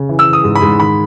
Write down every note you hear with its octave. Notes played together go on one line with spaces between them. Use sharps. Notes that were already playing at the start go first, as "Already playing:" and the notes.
Already playing: C#3
E3
E6
E3
D#6
G#2
B5
G#2
D#3 B5